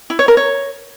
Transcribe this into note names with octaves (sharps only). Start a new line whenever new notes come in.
E4
C#5
A#4
C#5